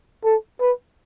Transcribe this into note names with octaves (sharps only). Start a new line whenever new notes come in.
A4
B4